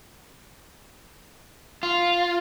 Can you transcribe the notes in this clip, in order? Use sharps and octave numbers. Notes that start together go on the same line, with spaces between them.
F4